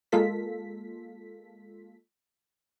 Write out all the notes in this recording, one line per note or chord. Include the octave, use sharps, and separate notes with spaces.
G#3 A#3 F4 A4 B6